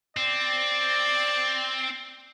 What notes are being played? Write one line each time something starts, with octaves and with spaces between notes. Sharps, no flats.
C4 D5